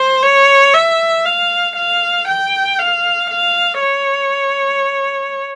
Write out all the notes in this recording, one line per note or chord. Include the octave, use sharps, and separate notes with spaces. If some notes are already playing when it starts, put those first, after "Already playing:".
Already playing: C5
C#5
E5
F5
F5
G5
F5
F5
C#5